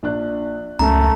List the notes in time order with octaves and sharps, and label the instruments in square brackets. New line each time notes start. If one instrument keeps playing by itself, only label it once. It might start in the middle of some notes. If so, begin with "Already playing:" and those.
[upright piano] A#1 D4 F#6
[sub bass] C#2 [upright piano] F#2 [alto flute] A3 [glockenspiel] A#5